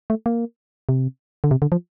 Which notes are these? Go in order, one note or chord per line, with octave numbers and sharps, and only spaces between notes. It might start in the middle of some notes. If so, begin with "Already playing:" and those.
A3
A#3
C3
D3
C3
D3
F3